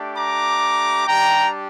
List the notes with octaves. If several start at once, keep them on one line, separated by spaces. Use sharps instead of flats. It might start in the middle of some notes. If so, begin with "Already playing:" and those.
Already playing: A3 D4 G4
A#5 D6
G3 D4 G4 G5 A#5